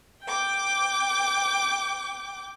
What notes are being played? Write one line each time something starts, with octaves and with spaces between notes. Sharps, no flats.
G5 D6